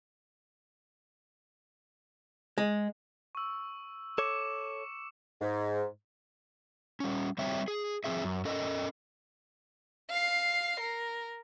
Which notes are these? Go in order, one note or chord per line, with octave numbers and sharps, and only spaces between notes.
G#3
C#6 E6
A4 C#5 D6 C#7 E7
G#2
G3 C#4
G3 C4 C#5 E5 G5
G#4
F3 F#3 C4 G#4 E5
F#2
C#4 A4 A#4 D#5
F5 C7
A#4